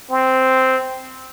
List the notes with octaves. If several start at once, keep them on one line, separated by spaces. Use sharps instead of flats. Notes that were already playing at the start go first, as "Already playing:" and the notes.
C4